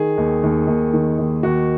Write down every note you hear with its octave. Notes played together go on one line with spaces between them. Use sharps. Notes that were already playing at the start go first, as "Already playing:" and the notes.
Already playing: D#3 G#4
D#2
D#2
D#2
D#3
D#2
D#2 F#4